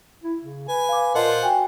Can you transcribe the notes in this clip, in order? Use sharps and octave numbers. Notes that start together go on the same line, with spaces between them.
E4
C#3
B4 G#5
F5 D6
A#2 F4 A#4 C5 D#5 F#5 A5
F#4 G5 G#5